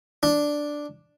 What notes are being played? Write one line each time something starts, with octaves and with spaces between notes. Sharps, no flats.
D4